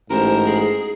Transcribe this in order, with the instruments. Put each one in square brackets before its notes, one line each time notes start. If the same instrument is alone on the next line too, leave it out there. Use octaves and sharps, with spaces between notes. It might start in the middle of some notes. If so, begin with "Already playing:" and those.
[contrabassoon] A1 [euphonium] G#2 [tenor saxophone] A#4 [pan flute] C5
[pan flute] G#4